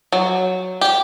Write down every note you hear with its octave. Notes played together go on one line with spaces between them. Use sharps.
F#3
G4